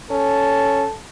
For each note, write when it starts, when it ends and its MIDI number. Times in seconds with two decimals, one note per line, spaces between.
0.11 0.85 61
0.11 0.95 69